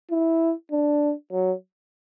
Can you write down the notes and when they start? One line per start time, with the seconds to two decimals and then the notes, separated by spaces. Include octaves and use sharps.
0.11 E4
0.71 D4
1.32 F#3